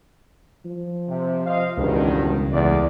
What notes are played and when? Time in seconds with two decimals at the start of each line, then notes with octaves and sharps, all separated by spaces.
0.66 F3
1.09 C3
1.46 C5 D#5 F5
1.77 E1 C#2 G2 D#3
2.53 E2 A3 D5